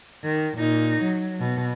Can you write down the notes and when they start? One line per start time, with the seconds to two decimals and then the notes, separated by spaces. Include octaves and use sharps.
0.24 D#3
0.58 A#2 D#4
1.02 F#3
1.39 B2